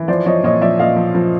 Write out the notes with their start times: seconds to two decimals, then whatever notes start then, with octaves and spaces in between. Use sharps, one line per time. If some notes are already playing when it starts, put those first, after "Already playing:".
Already playing: E3
0.08 F3 C5 D5
0.26 F3 C#5 D#5
0.44 A#2 C#5 D#5
0.61 F3 D5 E5
0.79 A#2 D#5 F5
0.96 F3
1.15 F3